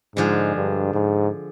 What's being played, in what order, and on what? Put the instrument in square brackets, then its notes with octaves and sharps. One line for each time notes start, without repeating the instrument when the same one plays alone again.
[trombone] G#2 [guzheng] D3 F3 G#3
[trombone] G2
G#2